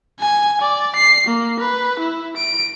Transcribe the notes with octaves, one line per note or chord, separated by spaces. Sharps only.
G#5
D5
C7
A#3
B4
E4
D7